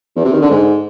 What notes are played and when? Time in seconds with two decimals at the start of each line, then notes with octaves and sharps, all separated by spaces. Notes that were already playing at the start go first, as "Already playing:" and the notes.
0.16 E2
0.25 C3
0.33 D#3
0.42 D3
0.50 G#2